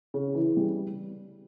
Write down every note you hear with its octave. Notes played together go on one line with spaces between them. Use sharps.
C#3
E3
G3